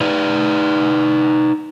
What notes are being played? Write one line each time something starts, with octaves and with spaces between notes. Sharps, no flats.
D#4 B4 D5